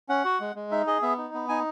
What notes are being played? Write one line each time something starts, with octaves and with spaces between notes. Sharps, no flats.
C#4 F#5
F#4
G#3
G#3
D#4 E5
G#4 D#5
B3 E5
D#4
B3
D#4 G#5